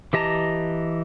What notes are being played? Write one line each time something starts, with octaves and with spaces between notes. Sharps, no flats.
E3 G4 D#5 A5 A#5